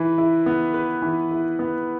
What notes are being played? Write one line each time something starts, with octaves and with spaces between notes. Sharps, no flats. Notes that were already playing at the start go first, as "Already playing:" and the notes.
Already playing: E3 B4
E4
B3
B4
E3
E4
B3